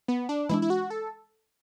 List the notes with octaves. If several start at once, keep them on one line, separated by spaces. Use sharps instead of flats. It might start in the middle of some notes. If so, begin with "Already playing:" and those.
B3
D4
E3 G#3 D4 E4
E4
F#4
A4